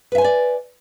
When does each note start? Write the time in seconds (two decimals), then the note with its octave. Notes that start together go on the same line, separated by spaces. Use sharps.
0.12 B4
0.15 E5
0.18 G#5
0.21 C5
0.24 D5